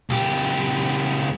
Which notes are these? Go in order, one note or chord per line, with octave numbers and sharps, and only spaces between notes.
C#2 G4